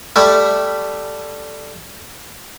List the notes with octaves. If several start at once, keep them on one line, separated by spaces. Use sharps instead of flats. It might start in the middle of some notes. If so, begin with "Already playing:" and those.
G3 A3 E4